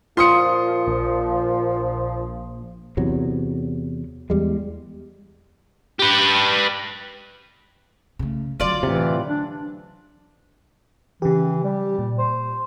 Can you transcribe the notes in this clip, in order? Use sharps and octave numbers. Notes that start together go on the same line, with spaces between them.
A#2 F3 F4 C6 D#6 C#7
A#1
E2 C3 F#3
E2 G3 G#3
G4 B4
C#3 A3
D3 F#3 F4 D5
A2 C3 E3
D4
C#3 E3 G4
G3
A#2
C5